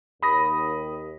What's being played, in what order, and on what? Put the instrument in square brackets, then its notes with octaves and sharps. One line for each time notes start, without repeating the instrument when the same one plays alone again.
[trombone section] D#2 [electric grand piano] B5 D#6 A#6